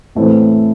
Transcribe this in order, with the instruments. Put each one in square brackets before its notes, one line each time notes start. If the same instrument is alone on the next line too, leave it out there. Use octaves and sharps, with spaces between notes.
[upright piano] A2 E3 A3 C4 E4